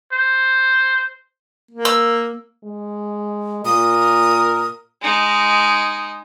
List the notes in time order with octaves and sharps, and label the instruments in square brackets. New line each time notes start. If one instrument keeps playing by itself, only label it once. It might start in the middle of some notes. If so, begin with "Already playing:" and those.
[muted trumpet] C5
[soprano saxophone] A#3
[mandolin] E6
[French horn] G#3
[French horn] A#2 [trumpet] A#4 [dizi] D#6
[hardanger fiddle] G#3 D#4